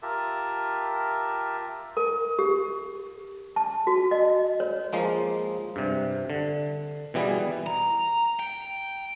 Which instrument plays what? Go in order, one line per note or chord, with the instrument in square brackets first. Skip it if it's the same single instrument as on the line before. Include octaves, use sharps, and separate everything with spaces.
[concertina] F4 G4 A#4 E5 A5
[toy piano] A#4
G4
A5
F#4
D#5
C#5
[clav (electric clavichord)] F3 G#3 A#3
G2 C3
D3
B2 E3 G3 B3 G#4
[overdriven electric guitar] A#5
G5